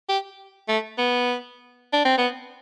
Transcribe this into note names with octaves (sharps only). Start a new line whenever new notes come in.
G4
A3
B3
D4
C4
B3